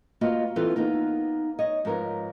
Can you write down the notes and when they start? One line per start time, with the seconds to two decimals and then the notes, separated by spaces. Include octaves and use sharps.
0.21 A#3 F4 F#4 B4 D#5 F5
0.56 E3 C4 E4 F4 A4 B4
0.76 A#3 B3 D#4 A#4
1.59 C#5 D#5
1.85 G#2 F3 A#4 B4 C#5